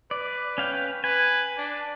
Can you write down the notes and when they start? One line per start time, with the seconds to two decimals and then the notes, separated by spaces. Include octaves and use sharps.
0.11 B4 D5
0.58 C#4 F5 G5
1.04 B4 G#5
1.57 D4